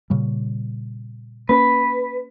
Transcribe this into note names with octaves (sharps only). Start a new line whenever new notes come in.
A#2 C#3 G3
A#3 C#4 B4